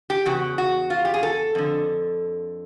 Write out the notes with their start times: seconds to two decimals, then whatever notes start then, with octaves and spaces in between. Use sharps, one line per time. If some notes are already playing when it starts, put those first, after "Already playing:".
0.10 G4
0.26 E2 C#3 F#4
0.58 F#4
0.90 F4
1.05 G4
1.14 G#4
1.23 A4
1.55 F2 D3